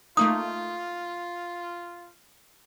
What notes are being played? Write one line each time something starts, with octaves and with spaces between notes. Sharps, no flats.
A3 A#3 D#4 F4 D#6